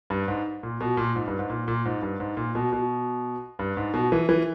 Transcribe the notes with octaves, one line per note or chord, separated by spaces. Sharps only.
G2
G#2
A#2
B2
A#2
G#2
G2
G#2
A#2
A#2
G#2
G2
G#2
A#2
B2
B2
G2
G#2
B2
E3
E3